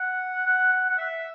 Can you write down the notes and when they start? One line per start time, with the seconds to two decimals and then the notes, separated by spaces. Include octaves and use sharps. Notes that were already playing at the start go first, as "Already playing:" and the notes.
Already playing: F#5
0.46 F#5
0.72 F#5
0.89 F#5
0.98 E5